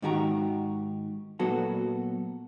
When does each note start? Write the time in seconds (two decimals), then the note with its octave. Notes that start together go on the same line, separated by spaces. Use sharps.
0.02 G#2 D#3 F#4 G4 A#5
1.39 A#2 F#3 B3 F#4 A4